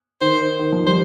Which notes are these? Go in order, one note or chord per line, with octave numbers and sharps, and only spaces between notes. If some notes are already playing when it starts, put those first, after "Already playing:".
D#3 C5
D#3
F3
G3 C5